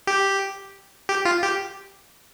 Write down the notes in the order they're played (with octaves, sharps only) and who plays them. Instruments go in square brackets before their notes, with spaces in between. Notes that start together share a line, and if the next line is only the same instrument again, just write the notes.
[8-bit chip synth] G4
G4
F4
G4